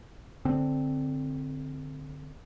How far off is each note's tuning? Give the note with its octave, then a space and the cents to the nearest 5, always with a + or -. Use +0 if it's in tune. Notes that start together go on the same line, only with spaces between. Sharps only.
D3 +0 C4 +0